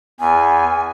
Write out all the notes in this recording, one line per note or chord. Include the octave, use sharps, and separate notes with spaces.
E2 G#5